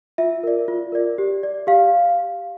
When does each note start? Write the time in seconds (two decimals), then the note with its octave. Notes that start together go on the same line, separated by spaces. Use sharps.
0.18 F4 E5
0.43 A#4 D5
0.68 F4
0.92 A#4 D5
1.18 G4
1.43 D5
1.67 G4 F5